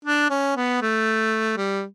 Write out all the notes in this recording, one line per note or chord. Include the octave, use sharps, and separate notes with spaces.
D4
C#4
B3
A3
G3